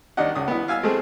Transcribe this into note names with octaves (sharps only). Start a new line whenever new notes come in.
D#2 D4 D#4 D#5 F#5
C#2 D#6
B3 E4
F5 G#5 E6 F6
G#3 A3 C4 G#4